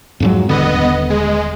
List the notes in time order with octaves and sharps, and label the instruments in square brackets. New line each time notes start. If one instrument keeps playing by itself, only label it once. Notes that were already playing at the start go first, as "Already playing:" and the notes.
[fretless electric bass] F2 G#2 F#3
[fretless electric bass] D#1 D3 [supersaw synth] B3 D#5
[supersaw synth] G#3